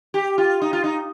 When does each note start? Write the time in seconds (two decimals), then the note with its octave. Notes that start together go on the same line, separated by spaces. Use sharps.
0.14 G4
0.38 F4
0.62 D#4
0.73 F4
0.84 D#4